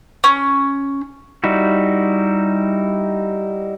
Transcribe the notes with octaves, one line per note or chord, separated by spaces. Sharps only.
C#4
G3 D#4 E4 F#4